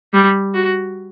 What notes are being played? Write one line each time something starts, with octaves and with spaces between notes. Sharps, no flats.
G3
F#4